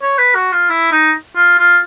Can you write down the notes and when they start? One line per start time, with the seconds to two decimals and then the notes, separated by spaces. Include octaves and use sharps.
0.02 C#5
0.18 B4
0.35 F#4
0.52 F4
0.69 E4
0.92 D#4
1.36 F4
1.58 F4